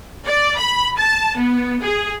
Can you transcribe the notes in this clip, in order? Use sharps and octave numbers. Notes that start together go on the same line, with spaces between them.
D5
B5
A5
B3
G#4